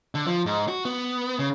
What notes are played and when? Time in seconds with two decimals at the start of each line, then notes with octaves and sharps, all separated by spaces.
0.15 D3
0.27 F3
0.46 G#2
0.68 F#4
0.85 B3
1.39 C#3